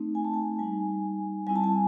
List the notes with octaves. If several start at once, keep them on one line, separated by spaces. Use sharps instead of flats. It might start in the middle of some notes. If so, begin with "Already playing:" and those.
Already playing: A3 C4 D#4
G#5
A5
G#5
G3 A#3 D#4 G#5
G3 C4 E4 G#5
A5
G#5